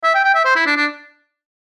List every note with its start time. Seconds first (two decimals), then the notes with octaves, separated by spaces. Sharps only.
0.04 E5
0.15 G5
0.25 G5
0.35 E5
0.45 C5
0.56 E4
0.66 D4
0.76 D4